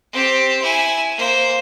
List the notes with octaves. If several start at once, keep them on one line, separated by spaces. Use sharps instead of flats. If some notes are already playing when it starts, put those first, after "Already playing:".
C4 G4
E4 G#5
A#3 C5